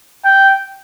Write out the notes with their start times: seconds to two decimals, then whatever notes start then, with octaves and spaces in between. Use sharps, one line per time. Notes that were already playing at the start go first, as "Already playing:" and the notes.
0.25 G5